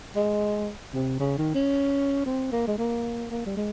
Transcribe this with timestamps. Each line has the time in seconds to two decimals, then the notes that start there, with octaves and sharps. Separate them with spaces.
0.16 G#3
0.94 C3
1.19 C#3
1.38 D#3
1.55 C#4
2.26 C4
2.52 A#3
2.67 G#3
2.78 A#3
3.31 A#3
3.46 G3
3.57 G#3